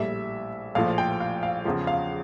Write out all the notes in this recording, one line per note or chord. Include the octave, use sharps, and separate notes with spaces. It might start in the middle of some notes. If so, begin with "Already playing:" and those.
Already playing: A#1 A2 G3 E5
A#1 A2 F3 F5
G5
F5
F5
E2 C#3 F3
F5